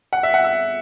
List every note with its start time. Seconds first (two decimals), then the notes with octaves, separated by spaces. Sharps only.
0.13 F#5
0.23 E5
0.34 F#5
0.44 E5